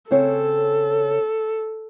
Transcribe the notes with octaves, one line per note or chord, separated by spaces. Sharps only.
C#3 C4 A4 C#5